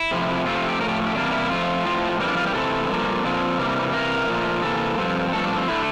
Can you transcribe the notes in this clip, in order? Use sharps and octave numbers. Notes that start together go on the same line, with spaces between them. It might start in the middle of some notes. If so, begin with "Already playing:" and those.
Already playing: E4
F2 C3 F3
C3 F3 A3 C4 F4
F4
G4
A2 F3 A3 A#4
G4
G4
E2 C3 G3 A#3 D4
E4
F2 D3 F3 A3 F4
A2 F3 C4
F2 E3 G3 A#3 C4
D4
F4
G4
C3 E3 A3 C4 A4
G2 F3 A#3
A#2 F3 C4
C3 E3 G3 A#3
C3 E3 A#3 A#4
A#2 F3 A3
C3 E3 A#3 A4
G2 F3 C4
G2 F3 A3 C4 A4
D4
C4
D3 A3 E4